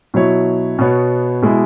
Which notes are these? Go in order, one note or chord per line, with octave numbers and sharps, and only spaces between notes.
B2 F#3 E4 C#5
B2 B3 F#4 C#5
B2 G#3 E4